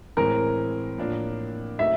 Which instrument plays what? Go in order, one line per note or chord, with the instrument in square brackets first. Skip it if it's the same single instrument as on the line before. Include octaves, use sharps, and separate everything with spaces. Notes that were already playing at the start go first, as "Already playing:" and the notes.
[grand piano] A2 E3 G#3 C4 [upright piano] A#4
[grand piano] A2 F3 A#3 D4
[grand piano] F#3 A3 C4 D#4 F#4 [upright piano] E5